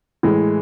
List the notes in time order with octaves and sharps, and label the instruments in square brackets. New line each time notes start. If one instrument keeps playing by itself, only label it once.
[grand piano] A2 E3 G#3